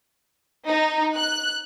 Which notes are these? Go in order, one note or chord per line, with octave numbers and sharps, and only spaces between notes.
D#4
F#6